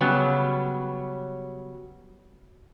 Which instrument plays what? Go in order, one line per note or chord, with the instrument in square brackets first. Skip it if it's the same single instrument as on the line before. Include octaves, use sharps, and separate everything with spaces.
[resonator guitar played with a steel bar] C#3 F#3 G3 B3